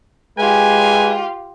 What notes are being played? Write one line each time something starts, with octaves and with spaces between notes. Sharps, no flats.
G#3 F4 G4 B4 G#5